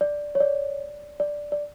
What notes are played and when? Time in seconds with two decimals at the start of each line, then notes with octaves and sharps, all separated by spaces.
0.01 D5
0.35 C#5
0.40 D5
1.20 D5
1.52 D5